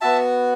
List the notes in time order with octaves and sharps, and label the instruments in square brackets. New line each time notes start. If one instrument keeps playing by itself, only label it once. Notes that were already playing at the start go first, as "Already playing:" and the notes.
[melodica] B3 F#4 E5 A5